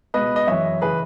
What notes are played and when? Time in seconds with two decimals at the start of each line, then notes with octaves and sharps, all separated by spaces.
0.14 C#2 B2 B4 D#5
0.36 D#5
0.47 F#2 E3 C#5 E5
0.81 C#3 E3 G#4 B4